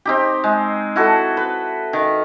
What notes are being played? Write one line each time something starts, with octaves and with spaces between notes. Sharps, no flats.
C4 D#4 G4
G#3
E4 F#4 A4
B4
D#3